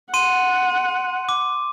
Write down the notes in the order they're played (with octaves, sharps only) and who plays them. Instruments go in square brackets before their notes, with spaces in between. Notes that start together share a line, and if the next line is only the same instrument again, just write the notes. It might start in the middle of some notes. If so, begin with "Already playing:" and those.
[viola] F#5 [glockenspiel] C6 D#7
[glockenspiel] D6